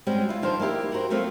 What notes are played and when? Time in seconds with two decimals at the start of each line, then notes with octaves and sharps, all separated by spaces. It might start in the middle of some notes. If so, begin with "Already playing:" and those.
0.07 G3 G#3 C4 C#4 F#4 G5
0.29 E4 F4
0.42 G2 D#3 F3 D4 C5
0.60 A#3 D#4 E4 G4
0.92 F#4 G4 A#4 C5
1.10 F#3 A3 A#3 C4 F4